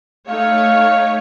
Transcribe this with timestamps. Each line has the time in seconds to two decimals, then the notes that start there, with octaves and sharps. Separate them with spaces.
0.29 A3 D#4 C#5 F5